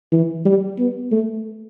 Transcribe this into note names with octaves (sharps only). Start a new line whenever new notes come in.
E3
G3
B3
A3